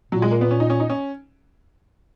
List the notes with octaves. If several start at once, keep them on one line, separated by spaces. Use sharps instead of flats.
A#2 F#3
G#3
A#3
B3
C#4
D#4
C#4
D#4
C#4